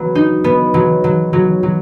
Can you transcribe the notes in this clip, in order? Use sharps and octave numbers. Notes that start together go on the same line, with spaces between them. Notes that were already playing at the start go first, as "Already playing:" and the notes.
Already playing: F#3 B3
D#4
B3
F#3
F#3
F#3
F#3